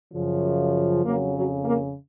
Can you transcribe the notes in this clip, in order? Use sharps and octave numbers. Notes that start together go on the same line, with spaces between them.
F#2 C#3 F3
F2 C#3 F#3 A#3
F#3
A#3